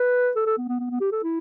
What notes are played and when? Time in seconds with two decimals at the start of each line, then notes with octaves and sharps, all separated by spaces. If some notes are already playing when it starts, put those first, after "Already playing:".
Already playing: B4
0.36 A4
0.46 A4
0.58 B3
0.68 B3
0.80 B3
0.91 B3
1.01 G4
1.12 A4
1.23 E4